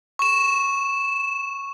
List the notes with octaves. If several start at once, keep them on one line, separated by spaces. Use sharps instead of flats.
C#6 E7